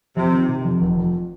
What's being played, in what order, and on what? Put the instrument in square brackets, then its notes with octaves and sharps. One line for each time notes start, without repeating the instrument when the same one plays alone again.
[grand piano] F2 [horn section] C3
[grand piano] D#3
C3
F2
F1
F2